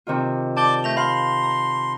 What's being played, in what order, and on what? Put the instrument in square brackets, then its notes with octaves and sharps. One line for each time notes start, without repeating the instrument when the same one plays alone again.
[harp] C3 D#3 F4
[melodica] D5 D6 [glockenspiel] A5 G6 G7
[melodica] A3 [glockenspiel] G6 A#6 F7
[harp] F5 [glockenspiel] B5 [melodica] C6
[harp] A#5